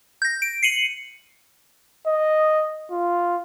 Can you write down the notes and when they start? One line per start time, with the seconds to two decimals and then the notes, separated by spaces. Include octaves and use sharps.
0.22 G6 A#6
0.42 D7
0.63 C7 C#7 D#7 F#7
2.07 D#5
2.91 F4